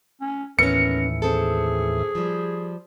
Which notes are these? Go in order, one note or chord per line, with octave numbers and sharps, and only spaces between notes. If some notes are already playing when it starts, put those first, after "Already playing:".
C#4
D#2 A2 E3 B3 C#4 A#4 C#7
C4 G#4 A4
F3 G3